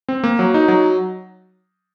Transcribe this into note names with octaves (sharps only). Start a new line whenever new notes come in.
C4
A#3
F#3
D#4
F#3